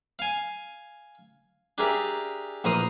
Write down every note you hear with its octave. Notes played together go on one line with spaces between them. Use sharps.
F5 G#5
D4 G4 G#4 A#4 D5 E5
A#1 E3 A#4 C5 D#6